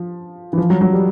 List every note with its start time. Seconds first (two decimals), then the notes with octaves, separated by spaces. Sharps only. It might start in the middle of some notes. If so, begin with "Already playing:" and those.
Already playing: F3
0.53 E3
0.58 F3
0.70 F#3
0.81 F#3
0.93 G3